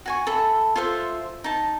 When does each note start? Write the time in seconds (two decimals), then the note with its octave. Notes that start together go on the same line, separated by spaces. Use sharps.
0.06 F#4 G#5 C#6
0.27 A4 E5 B5
0.76 F4 A4 C5 E5
1.44 D#4 A5